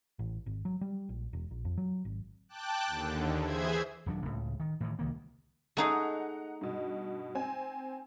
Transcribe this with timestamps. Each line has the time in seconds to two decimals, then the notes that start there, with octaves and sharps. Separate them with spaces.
0.19 A1
0.46 G#1
0.65 F#3
0.81 G3
1.09 A#1
1.33 E1
1.51 A#1
1.65 F2
1.77 F#3
2.05 G#1
2.49 G5 A5 D6 F#6
2.87 D#2 D3
3.41 E3 G#4 C5 E5 G#6
4.06 D#1 D#2 F#3 D4
4.25 C#2 A2 C#3
4.60 D#3
4.80 A2 D#3 E3
4.99 C2 D#3 A#3
5.77 A3 D#4 G#4 D#5 F#5 A#5
6.61 G2 B2
7.35 C4 G#5